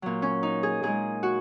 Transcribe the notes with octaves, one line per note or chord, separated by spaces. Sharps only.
A#2 F#3
C#4
D#4
G#4
A#2 G#3 G#4
F#4